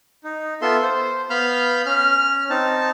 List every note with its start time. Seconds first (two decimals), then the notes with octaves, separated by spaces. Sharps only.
0.24 D#4
0.62 B3 F4 A4 E5 C6
0.82 C5
1.30 B3 F5 B5 F6 G6
1.86 C#4 F6
2.50 C4 D#4 A5